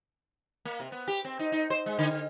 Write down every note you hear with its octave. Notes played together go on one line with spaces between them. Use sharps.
A#3
C3
B3
G4
C4
D#4
D#4
C5
G#3
D3
D3